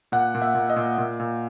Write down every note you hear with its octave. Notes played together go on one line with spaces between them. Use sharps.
A#2 F#5
A#2
E5
A#2
D#5
A#2
A#2
A#2